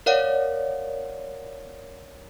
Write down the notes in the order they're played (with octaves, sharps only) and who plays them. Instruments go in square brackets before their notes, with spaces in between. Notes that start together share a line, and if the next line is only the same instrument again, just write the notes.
[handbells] A#4 C#5 D5 F5 F#5